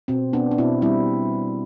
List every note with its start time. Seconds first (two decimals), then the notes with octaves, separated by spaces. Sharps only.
0.08 B2 C4
0.33 B2 B3 D4
0.51 D4
0.58 B2 C4 E4
0.82 G3 C4 E4